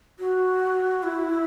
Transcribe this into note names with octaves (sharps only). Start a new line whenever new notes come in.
F#4
E4